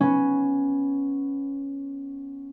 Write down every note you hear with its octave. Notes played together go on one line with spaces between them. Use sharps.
B3 C#4